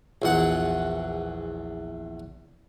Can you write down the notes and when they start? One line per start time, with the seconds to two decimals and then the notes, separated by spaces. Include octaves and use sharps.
0.22 A#1 E2 F#5